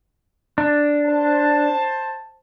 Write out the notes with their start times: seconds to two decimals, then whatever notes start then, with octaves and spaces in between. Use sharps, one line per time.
0.58 D4
1.06 C5 A5